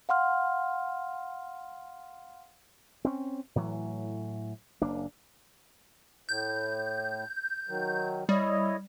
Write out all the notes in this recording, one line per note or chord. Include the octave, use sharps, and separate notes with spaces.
F5 F#5 C6 F6
C4 C#4
A2 E3 F#3
F#1 A#3 D4
A2 G6
D#3 F#3
G3 E4 C#5 D#5